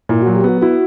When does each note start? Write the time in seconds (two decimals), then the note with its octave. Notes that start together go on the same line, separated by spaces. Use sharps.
0.09 A#2 E4
0.22 F#3 F#4
0.36 G4
0.44 B3
0.49 F#4
0.61 E4 F#4